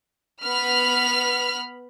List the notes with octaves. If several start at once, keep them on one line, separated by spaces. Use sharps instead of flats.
B3 B5 F6